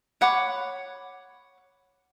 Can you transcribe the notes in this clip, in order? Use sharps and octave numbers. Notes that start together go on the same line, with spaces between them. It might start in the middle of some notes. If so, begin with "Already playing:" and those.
C#5 F#5 B5 D6